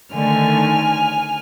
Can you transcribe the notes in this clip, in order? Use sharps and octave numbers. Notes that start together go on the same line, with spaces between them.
D3 D#3 A3 G#5 F6